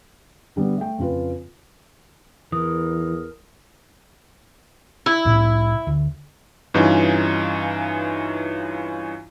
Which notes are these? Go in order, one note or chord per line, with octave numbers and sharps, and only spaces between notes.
D3 G3 B3
A3 G5
F2 C#3 F4 B4
E2 E3 A#4 D#6
E4
C2 A2 C3
D2
G2 E3 C#4 D#4 F4